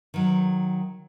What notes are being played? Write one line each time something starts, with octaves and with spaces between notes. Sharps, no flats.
D#3 F#3